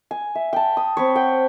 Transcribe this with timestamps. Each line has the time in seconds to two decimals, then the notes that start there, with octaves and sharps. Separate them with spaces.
0.11 G#5
0.35 E5
0.53 G5 A5
0.77 D#6
0.97 C4 B4 C#5
1.15 F#5 G5